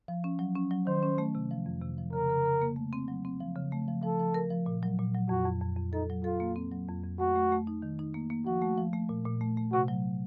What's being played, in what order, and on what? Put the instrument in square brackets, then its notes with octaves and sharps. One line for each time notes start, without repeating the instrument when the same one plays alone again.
[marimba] F3
C#4
F#3
C#4
F#3
[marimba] D#3 [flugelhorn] C5
[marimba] C#4
A3
C3
F3
F2
C3
F3
[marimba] C#3 [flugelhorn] A#4
[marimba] C#3
C#3
A#3
A3
C4
F#3
C4
F3
C#3
A3
F3
[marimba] F3 [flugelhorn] A4
[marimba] F3
A#4
F3
A#2
F#3
A#2
F#3
[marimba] F2 [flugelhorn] F#4
[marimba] F2
F2
F2
[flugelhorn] D#4 [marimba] A4
[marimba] F#3
[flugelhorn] F4 [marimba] A4
[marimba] A#3
C4
F#3
F2
F2
[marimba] A3 [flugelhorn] F#4
[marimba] A3
A3
D#4
D#3
D#4
A#3
A#3
[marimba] F3 [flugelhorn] F#4
[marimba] A3
F3
A3
A#2
A#2
A3
A3
[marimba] C3 [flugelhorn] F#4
[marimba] F#3